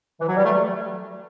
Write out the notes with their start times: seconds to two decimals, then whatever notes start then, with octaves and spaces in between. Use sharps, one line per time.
0.20 E3
0.28 F#3
0.36 G3
0.44 A3